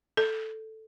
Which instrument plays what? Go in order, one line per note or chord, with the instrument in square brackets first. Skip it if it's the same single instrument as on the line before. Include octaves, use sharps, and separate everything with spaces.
[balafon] A4